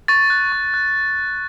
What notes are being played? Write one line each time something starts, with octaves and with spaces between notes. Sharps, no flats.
C#6 A6
F#6
C#6
F#6